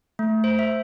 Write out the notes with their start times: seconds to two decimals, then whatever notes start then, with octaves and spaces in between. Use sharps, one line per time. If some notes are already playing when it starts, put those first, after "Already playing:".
0.19 A3
0.44 C5
0.59 E5